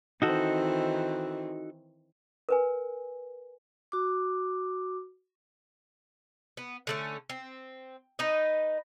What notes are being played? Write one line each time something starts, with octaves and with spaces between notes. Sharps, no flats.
D#3 E3 C4 D#4 F#4 A4
A#4 B4 G#5
F#4 D6
B3
D3 A3 C#4
C4
D#4 B4 D#5